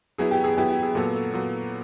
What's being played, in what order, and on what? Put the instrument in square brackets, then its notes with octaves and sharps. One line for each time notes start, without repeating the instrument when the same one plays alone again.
[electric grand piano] F#3 B3 E4 [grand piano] G#4
[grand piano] G4
G#4
[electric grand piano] F#3 B3 E4 [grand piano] G4
[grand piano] G4
G#4
[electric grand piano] A#2 F#3 B3 [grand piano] A4
[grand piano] A4
[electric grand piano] A#2 F#3 B3